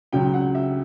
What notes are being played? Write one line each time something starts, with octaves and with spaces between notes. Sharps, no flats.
C#2 C#3 F#3 G5
F#5
E5